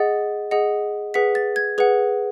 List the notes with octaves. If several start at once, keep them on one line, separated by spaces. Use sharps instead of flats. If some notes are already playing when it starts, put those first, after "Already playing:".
Already playing: G#4 D#5 F#5 A6
G#4 D#5 F#5
G#4 B4 F#5 B6
A6
G#6
G#4 B4 F#5